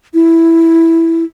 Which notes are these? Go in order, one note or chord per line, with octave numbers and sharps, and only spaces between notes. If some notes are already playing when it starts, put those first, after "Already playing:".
E4